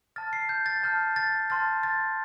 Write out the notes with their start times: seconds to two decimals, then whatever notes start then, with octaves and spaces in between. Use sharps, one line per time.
0.16 A5 F6 A6
0.33 C7
0.49 G6
0.66 A6
0.83 A5 F6 G6
1.16 A6
1.50 A5 C6 F6 A6
1.83 A6